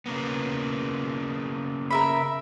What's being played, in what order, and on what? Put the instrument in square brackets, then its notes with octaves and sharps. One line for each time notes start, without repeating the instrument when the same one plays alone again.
[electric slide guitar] C#3 A#3 B3
[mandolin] A#4 E5 B5